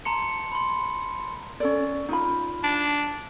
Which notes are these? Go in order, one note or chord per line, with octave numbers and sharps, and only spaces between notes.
A5 A#5 C6 C#7
B5 C6
C#4 A4 D5
D#4 F4 B5
D4